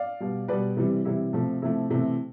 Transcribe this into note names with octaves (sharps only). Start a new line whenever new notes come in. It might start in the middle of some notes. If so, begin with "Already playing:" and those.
Already playing: D5 F5
B2 G3
B2 G3 B4 D5
C3 E3 G3
C3 E3 G3 E4
C3 F3 A3
C3 F3 A3 E4
C3 E3 A3